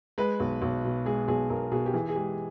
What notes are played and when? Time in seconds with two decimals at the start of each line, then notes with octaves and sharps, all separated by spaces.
0.18 G#3 B4
0.40 B1
0.62 B1
0.84 B2
1.06 G#3 G#4
1.28 B1 G#4
1.50 B1 A#4
1.72 B2 G#4
1.86 G4
1.94 E3 G#4
2.09 G#4
2.15 G#3 G4